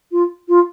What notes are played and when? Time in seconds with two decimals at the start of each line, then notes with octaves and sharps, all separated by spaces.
0.12 F4
0.49 F4